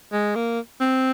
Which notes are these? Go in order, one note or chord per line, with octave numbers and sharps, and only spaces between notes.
G#3
A#3
C4